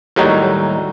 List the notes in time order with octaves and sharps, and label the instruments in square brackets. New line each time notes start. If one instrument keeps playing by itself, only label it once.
[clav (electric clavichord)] D#2 A2 F#3 G3 D#4 F#4